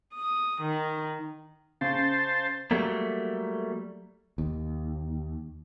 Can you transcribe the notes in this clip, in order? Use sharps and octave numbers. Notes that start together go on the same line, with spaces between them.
D#6
D#3
C#3 C5 A5
F#3 G3 A3 A#3
D#2